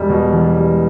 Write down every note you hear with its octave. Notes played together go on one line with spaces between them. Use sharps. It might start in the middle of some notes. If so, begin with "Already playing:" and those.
Already playing: E1 G3
B2
E2
G3